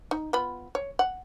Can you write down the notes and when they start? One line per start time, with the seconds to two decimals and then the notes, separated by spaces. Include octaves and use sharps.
0.11 D#4
0.33 B3 F4 B5
0.75 C#5
0.99 F#5